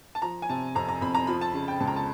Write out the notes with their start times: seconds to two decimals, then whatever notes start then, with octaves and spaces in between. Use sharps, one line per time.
0.15 A5
0.22 F3 A#5
0.42 G#5
0.49 C3 A5
0.75 F2 A#5
0.88 A#5
1.01 F2 B5
1.15 A#5
1.27 F3 B5
1.41 A5
1.54 C#3
1.68 G5
1.80 C#2 A5
1.87 A#5
1.96 A5